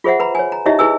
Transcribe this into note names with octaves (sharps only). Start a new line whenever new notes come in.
F4 G#4 C5 E5 F#5
B4 A#5 B5
C#5 G#5
A#5
D#4 E4 G4 C#5 D#5 E5
E4 G#4 B4 G#5 E6